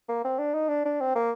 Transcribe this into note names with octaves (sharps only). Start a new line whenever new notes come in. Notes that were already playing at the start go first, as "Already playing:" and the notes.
A#3
C4
D4
D#4
D4
D4
C4
A#3